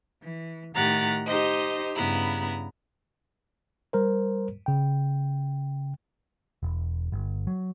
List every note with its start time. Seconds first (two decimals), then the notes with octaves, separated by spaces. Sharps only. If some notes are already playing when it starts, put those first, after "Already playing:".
0.22 E3
0.74 A2 D#3 G4 F#5 A#5 A6
1.25 D#4 G4 C5 D#5
1.95 G2 C#3 B3 E4 A#5
3.93 G3 A#4 C5
4.66 C#3 G5
6.63 E1
7.12 G1
7.47 F#3